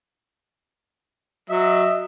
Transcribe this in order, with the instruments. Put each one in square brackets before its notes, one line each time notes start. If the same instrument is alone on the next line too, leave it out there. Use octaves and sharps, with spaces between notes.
[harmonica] F#3 [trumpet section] D#5 E5